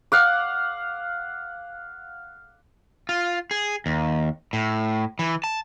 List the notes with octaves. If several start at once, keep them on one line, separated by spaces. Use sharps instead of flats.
F5 F#5 D6
F4
G#4
D#2
A2
E3
A5